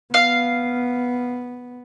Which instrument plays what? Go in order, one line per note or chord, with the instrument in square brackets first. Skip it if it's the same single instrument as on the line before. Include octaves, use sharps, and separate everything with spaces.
[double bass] B3 [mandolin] F5